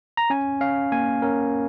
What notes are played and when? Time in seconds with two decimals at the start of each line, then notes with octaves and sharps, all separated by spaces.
0.17 A#5
0.30 C#4 G#5
0.61 C#4 F5
0.92 A#3 G#5
1.22 C#4 A#4